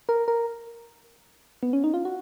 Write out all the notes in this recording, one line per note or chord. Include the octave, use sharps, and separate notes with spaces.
A#4
A#4
B3
C#4
D#4
F4
F#4